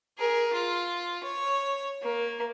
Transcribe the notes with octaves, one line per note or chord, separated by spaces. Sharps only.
G#4 A#4
F4
C#5
A#3